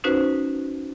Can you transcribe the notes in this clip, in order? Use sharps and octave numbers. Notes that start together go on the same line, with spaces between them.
C#4 D#4 F#4 B4 C5